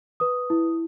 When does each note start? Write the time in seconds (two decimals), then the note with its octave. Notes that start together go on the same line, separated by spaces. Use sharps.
0.20 B4 D#6
0.50 E4